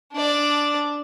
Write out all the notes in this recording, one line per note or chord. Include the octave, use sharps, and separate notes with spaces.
D4 D5